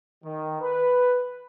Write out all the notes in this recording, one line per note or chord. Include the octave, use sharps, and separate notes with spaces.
D#3
B4